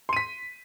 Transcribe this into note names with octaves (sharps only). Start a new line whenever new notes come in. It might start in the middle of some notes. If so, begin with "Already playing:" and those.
C6 B6 D#7